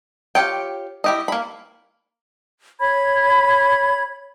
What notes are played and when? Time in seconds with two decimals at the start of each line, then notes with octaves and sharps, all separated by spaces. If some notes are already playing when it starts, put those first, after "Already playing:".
0.35 F4 G4 C#5 G5
1.04 E4 G4 D#5
1.28 A#3 B5
2.79 C#5 B5 G#6